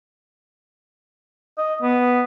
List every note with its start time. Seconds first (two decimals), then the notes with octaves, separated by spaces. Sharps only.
1.58 D#5
1.82 B3